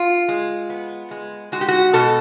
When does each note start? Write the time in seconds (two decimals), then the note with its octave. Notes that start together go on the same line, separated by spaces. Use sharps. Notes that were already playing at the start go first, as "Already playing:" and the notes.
Already playing: F4
0.28 G#3
0.70 B3
1.11 G#3
1.52 G#3 F#4
1.61 G4
1.68 F#4
1.93 B2 A4